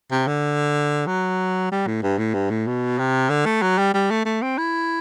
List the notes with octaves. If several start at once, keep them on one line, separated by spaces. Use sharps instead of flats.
C3
D3
F#3
G3
A2
G2
A2
G2
A2
B2
C3
D3
A3
F#3
G3
G3
A3
A3
C4
E4